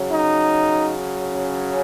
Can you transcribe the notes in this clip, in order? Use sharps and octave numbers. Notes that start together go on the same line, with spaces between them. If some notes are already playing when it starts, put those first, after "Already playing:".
Already playing: C#3 F#3
D#4
C#4